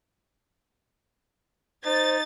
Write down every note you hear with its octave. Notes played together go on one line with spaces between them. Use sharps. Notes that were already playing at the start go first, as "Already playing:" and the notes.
D#4 C5 A6